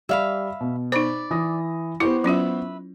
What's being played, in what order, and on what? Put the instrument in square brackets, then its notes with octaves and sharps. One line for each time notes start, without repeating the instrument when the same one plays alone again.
[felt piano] G3 D5 [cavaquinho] E5 F5 B5
[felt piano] B2
[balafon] D#4 C5 [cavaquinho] D5 B5
[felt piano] E3 D#6 A#6
[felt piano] B3 C5 C#6 [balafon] E4 [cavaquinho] G4
[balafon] F#3 C#4 F4 [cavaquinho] B4 E5